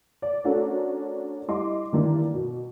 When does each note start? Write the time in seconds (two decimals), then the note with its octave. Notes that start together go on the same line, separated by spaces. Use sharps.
0.22 D5
0.44 A3 C#4 D4 F#4 A4 A#4
1.48 G3 E4 D#5 C6 D6
1.93 G2 D#3 E3 A#3 D4 E4
2.34 B2